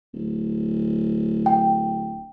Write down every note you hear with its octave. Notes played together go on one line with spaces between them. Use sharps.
D1
G5